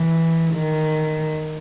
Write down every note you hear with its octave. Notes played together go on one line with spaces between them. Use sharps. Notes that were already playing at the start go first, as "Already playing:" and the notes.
Already playing: E3
D#3